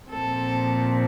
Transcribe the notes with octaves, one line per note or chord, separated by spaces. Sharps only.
A#2 F3 C4 A4